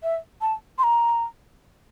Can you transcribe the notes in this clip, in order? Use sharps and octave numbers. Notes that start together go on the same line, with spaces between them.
E5
A5
C6
A#5